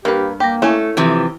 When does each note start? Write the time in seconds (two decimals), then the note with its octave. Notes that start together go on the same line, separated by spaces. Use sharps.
0.05 G2 A#3 G4 B4
0.40 A#3 G4 G5 A#6
0.62 A3 C#4 E4 A4 G#5
0.97 C3 E3 F3 G4